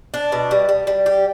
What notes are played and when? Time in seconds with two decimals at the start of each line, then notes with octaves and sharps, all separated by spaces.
0.14 D4
0.32 B2
0.51 G3
0.69 G3
0.87 G3
1.06 G4